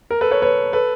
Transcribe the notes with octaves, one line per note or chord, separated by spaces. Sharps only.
A#4
A4 B4
B4 C#5
B4 C#5
A4 B4